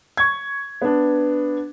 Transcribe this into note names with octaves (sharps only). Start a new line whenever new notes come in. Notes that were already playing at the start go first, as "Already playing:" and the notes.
C#6 G#6
B3 D4